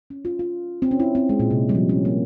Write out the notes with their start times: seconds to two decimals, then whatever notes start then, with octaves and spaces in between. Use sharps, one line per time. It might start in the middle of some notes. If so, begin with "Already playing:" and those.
0.10 C#4
0.25 F4
0.39 F4
0.82 C4
0.91 C#4
1.00 E4
1.15 C4
1.29 G#3
1.40 A#2
1.50 C3
1.69 G3
1.75 F3
1.89 C#4
2.05 A#3